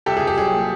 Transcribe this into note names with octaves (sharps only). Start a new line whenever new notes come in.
C2 G4 A4
G#4
C2
G4
F#3 G#4
A#2